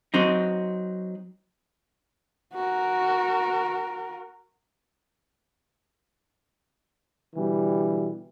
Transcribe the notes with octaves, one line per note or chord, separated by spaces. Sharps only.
F#3 C4 D#4
F#4 A#4
B2 D3 E3 G3